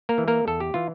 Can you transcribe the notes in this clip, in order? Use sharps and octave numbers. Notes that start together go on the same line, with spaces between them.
A#3 A#4
E3
A#3 A#4
E2 A4
G4
E3 F4